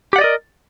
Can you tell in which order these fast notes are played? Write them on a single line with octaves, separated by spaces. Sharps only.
G4 F#5 D5 D#5 A#4